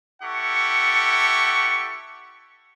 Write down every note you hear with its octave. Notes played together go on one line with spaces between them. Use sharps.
E4 G4 A4 F#5 C#6